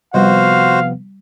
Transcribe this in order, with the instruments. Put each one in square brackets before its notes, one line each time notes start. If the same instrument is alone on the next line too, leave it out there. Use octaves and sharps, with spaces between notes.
[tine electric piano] C3 F3 B3 [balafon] G3 [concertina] F#4 C5 [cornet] F5